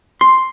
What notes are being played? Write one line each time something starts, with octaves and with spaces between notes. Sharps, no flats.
C6